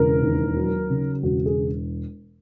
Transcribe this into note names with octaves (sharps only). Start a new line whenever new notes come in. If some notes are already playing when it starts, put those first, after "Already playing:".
Already playing: E1 C#3 A#4
D#2
F#3
C#3
E1 F#4
G#4